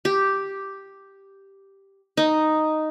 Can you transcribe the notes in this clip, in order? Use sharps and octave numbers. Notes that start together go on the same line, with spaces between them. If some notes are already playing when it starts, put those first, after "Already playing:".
G4
D#4